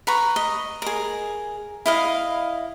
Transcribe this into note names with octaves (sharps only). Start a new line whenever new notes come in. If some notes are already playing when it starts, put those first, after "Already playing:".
B4 A#5 C#6
D#5
G#4 A#4
E4 D#5 F5